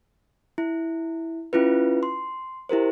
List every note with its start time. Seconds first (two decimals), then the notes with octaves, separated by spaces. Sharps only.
0.58 E4
1.53 C#4 E4 F4 B4
2.03 C6
2.69 E4 G4 A#4 C5